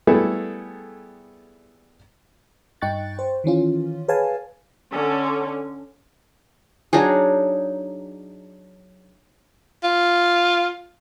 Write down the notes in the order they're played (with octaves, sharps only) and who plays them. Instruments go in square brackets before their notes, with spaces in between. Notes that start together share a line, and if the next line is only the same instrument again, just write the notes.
[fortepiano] G3 A3 B3 E4 G#4 A4
[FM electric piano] G2 D#4 G5 C#6 F#6 A6
C5
D#3 E3 C#4 F4
G#4 B4 C#5 F5 G#5 A5
[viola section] D3 C#4
[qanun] F#3 D4 D#4 G#4
[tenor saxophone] F4